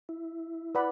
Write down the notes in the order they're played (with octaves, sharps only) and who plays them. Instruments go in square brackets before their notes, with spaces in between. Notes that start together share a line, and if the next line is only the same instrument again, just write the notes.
[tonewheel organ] E4
[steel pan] B4 D5 F#5 B5